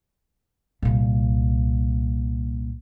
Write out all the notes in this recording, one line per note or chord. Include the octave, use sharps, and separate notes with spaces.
C2 A#2